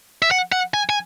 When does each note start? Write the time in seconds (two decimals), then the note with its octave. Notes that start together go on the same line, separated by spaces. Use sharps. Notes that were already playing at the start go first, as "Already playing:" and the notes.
0.22 E5
0.31 F#5
0.52 F#5
0.74 G#5
0.89 G#5